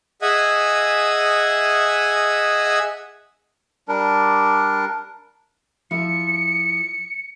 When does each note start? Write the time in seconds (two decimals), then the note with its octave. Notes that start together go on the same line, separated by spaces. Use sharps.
0.22 G#4 D#5 E5 F#5 G#5
3.88 G3 D4 A#4
5.91 F3 E4 C#7